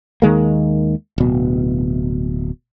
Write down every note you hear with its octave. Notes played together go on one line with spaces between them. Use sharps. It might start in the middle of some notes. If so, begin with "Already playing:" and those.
D#2 D#3 G#3 A#3
D1 B2